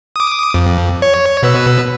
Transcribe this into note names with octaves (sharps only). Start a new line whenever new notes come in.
D6 D#6
F2
C#5
B2 B4 E6